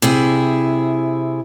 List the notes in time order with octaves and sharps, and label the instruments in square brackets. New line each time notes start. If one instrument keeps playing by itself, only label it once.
[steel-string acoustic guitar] C3 E4 G#4